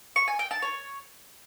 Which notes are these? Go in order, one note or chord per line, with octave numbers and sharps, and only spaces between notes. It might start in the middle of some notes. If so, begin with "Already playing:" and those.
C#6
G#5
G5
A5
C#5